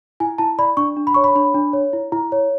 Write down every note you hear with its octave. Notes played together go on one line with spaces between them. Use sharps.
E4 G#5
E4 A5
D5 B5
D4 C#6
D4
B5
C#5 C#6
B5
D4 B5
D4
C#5
E4
E4
C#5